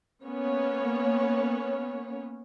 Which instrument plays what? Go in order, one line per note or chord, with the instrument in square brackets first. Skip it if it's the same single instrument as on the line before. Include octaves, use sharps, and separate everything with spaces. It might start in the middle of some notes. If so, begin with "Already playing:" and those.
[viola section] A#3 B3 C#4 C#5